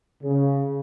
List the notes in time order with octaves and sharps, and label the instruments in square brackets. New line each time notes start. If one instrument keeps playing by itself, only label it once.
[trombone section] C#3